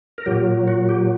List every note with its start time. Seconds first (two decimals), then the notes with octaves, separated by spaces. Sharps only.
0.18 A#4
0.26 A#2 F#3 G4
0.68 F#4
0.89 G4